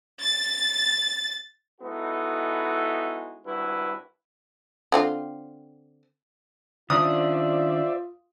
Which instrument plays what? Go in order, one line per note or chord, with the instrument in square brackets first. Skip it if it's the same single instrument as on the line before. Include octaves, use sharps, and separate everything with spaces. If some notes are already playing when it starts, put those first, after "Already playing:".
[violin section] A6
[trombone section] G#3 B3 D#4 E4 F#4 A4
G#1 G2 E4 F#4 B4
[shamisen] D3 C4 F4
[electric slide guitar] D#3 C#4 D4 [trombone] F4 [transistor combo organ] C5 D5 E5 [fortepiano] D#6